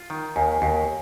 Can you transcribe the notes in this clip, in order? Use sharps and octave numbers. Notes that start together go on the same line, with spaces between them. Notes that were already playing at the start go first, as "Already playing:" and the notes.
Already playing: F4
D#3
D#2 G#5
D#2